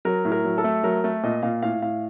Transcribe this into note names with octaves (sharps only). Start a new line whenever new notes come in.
F#3 A#4
A2
A#4
F#3
A4
A3
F#3 A#4
A3
A#2 D#5
A#2 F5
A2 F5
A2 F5